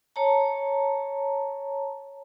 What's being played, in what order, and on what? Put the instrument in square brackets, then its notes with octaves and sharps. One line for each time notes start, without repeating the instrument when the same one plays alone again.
[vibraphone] C#5 A5 A#5